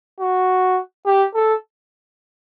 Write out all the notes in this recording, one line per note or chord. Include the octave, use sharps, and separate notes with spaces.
F#4
G4
A4